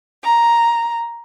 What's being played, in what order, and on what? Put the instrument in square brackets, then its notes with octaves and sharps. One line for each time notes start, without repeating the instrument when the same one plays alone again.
[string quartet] A#5